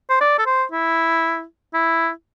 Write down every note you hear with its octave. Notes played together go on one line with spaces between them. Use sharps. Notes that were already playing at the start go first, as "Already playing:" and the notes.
C5
D5
A4
C5
E4
E4